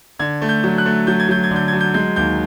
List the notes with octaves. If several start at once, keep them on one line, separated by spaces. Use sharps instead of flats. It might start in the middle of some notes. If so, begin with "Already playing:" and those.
D3 G#6
A3
G6
F#3
F#6
A3
F#3 G6
G#6
F#3 G6
G#6
D3
G6
F#3 G#6
G6
G#3 G6
D#2 G6